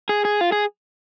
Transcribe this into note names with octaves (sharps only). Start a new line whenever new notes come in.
G#4
G#4
F4
G#4